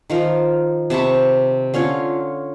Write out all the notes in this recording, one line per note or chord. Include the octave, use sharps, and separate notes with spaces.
D#3 F3 A#4
C3 A5 B5 C#6
D3 C#4 F4 C#5